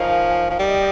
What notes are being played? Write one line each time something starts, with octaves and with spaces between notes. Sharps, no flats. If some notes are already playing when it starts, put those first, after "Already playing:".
Already playing: F3 D#4 A#4 C#5 F5 G#5
F3
G3 D#5 G5